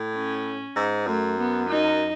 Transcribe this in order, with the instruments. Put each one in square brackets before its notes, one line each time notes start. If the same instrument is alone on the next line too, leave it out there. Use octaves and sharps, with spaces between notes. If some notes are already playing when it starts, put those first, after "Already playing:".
Already playing: [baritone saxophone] A2
[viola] C#4
[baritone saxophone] G#2
[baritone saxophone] F#2 [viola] A3
[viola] B3
D#4